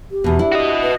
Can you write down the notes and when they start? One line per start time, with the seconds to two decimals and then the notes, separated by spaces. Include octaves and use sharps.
0.11 G4
0.24 E2 B2
0.39 D4 E4
0.52 F#4 D#5
0.83 B4